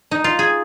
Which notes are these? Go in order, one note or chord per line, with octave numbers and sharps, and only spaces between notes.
D#4
F4
G#4